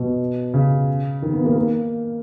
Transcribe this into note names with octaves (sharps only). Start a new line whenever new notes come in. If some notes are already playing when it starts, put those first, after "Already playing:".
Already playing: B2
C#3
D#3
B3
A#3
A#3